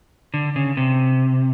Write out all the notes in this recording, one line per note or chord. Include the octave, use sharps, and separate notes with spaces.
D3
C#3
C3